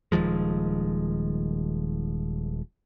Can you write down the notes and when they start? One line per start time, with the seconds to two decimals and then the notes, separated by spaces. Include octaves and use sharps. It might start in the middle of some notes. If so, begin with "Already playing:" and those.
0.12 D#1 D#3 F3 G#3